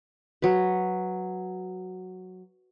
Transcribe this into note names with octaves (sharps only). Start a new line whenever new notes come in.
F#3 B4